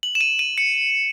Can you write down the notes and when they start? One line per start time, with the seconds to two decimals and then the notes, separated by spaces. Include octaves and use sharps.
0.03 F#7
0.15 E7
0.21 D#7
0.39 D#7
0.58 C#7